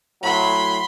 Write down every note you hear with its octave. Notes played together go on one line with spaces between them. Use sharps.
A2 F#3 B5 C6